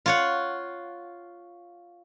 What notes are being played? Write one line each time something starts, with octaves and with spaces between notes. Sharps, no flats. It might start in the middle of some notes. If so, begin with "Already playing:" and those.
F4 C#5 F#5